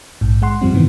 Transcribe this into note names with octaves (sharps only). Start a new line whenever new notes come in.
A#1 G#2
G#3 F#5 C6
F#2 F3 G3 C4
G#2 C3 D#3 E3 B3